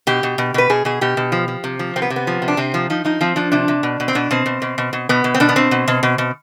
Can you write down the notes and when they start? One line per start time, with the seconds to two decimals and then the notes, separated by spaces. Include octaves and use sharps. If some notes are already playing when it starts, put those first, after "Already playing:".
0.07 B2 G4
0.23 B2
0.38 B2
0.54 B2 B4
0.70 B2 G#4
0.85 B2 G#4
1.01 B2 G4
1.17 B2
1.32 F3
1.48 F3
1.64 C3
1.79 F3
1.96 C3 C4
2.02 B3
2.10 C3
2.16 B3
2.27 F3
2.42 C3
2.48 D4
2.57 C3 C4
2.74 F3
2.90 F3 D#4
3.05 F3 D#4
3.21 F3 C4
3.36 F3 D4
3.52 C3 D4
3.68 C3
3.83 B2
4.00 B2
4.08 C4
4.15 B2 D4
4.31 B2 C4
4.46 B2
4.62 B2
4.78 B2
4.93 B2
5.09 B2 B3
5.24 B2
5.34 C4
5.40 B2 D4
5.49 B3
5.56 B2 C4
5.71 B2
5.88 B2
6.03 B2
6.18 B2